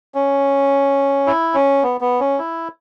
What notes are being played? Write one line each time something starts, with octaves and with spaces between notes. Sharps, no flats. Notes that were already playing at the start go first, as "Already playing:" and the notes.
C#4
E4
C#4
B3
B3
C#4
E4